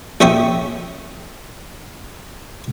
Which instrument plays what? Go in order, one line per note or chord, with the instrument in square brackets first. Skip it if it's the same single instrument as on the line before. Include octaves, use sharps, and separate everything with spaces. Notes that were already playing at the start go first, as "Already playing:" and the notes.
[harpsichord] A#1 C#4 E5 G5 C#6 D#6